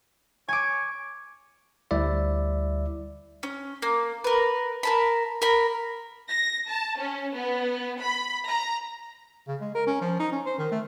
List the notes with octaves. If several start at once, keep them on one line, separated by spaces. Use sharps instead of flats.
C#5 G#5 D6
D2 G3 E4 D5 E5
C#4
A#3
A#4 B4
A#4 A5 B5
A#4 B5
A#6
A5
C#4
B3
B5
A#5
C#3
G#3
A#4
C#4
F3
D#4
C#4
C5
D#3
A3